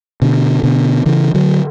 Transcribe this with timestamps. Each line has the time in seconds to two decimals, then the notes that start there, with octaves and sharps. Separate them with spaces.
0.22 B2 D3
0.63 B2 D3
1.06 C#3 E3
1.34 D3 F#3